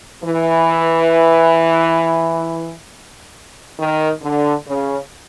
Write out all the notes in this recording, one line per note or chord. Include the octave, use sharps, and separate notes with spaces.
E3
D#3
D3
C#3